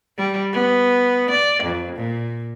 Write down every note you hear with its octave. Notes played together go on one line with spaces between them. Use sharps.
G3
B3
D5
F2
A#2